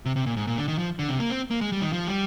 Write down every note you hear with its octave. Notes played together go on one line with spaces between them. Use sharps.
C3
C3
A#2
G#2
A#2
D3
D#3
F3
D3
C3
A#3
C4
A#3
G#3
G3
D#3
F3
G3